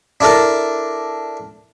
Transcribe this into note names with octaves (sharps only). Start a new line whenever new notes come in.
D4 E4 A4 A#4